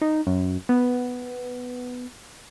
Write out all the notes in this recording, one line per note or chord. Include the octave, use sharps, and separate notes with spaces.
D#4
F#2
B3